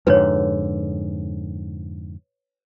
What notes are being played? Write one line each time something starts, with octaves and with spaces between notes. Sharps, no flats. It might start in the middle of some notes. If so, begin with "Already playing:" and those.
F2 G#2 D3 B4 C#5